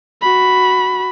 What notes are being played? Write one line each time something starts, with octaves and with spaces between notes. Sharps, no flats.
F#4 B5